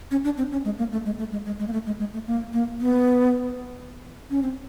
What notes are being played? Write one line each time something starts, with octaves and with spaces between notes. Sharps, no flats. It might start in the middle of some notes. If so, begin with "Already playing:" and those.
C#4
D4
C4
C#4
G#3
A#3
A3
G#3
A3
G#3
G#3
G#3
A#3
A3
G#3
G#3
A3
A#3
A#3
B3
C#4
C4